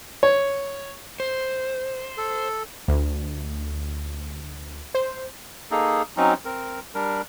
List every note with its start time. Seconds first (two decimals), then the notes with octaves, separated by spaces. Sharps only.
0.23 C#5
1.20 C5
2.18 A4
2.88 D2
4.94 C5
5.71 A#3 D#4 G#4 A4
6.17 F#3 C4 C#4 D#4
6.45 C4 A#4
6.95 G3 D4 A#4